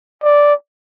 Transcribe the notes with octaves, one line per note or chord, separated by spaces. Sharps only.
D5